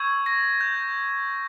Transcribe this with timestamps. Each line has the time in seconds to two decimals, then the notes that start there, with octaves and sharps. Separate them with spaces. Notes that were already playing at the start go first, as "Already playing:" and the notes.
Already playing: C#6 E6 G6 G#6
0.26 A#6
0.61 G6